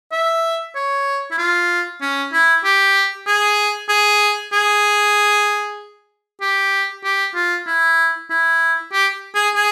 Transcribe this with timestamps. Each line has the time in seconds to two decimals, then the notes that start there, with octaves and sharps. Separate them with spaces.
0.12 E5
0.75 C#5
1.31 E4
1.38 F4
2.01 C#4
2.33 E4
2.64 G4
3.27 G#4
3.89 G#4
4.53 G#4
6.41 G4
7.04 G4
7.35 F4
7.67 E4
8.30 E4
8.93 G4
9.35 G#4
9.55 G#4